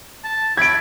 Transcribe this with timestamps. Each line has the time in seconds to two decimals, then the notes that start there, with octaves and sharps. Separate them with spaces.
0.24 A5
0.57 E4 G#6 D7